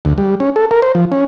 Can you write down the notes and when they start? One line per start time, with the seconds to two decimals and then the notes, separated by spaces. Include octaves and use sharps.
0.05 D2
0.18 G3
0.40 C#4
0.56 A4
0.71 A#4
0.82 C5
0.95 F3
1.12 C#4